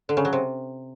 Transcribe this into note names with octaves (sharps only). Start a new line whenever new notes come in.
D3
C#3
F#3
C3